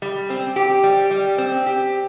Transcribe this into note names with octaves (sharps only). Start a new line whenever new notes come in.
G3
C4
G4
G3
G3
C4
G4